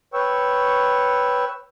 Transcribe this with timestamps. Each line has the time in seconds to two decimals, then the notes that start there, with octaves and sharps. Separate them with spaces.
0.14 B4 C#5 G5 C#6 E6